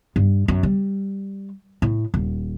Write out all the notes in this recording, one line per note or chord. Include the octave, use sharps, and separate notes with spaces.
G2
F#2
G3
A2
D#1